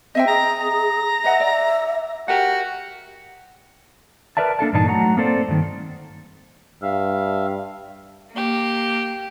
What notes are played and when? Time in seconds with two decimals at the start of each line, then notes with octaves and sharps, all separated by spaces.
0.15 C4 D#5 E5 G5
0.27 G#4 A#5
0.60 A#5
1.24 B4 D#5 E5 F#5
1.40 D5
2.28 F#4 G4 A#4 F#5
4.37 A#4 B4 D5 E5 A5
4.59 A#3 D4 A4 A5
4.73 G2 A#2 E3 D4 D#4 A5
4.87 F#3 A3 F#4 F#5 A#5
5.17 A#3 C4 A4 C5 D5
5.48 G2 D#3
6.82 G2 E5 F5
8.31 A#3 G4